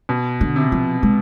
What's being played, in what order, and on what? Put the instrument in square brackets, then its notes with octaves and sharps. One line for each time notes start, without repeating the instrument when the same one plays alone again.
[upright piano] B2
[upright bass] D3
[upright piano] C3
[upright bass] F3
G#3